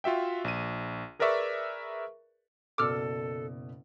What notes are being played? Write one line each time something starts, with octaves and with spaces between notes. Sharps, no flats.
F4 F#4 E5 G5
A#1 D#7
G#4 A#4 B4 D5 E5 C#6
F#1 B2 A4 D5 D6 E6 F6